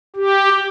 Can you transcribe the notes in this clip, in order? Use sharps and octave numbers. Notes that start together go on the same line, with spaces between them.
G4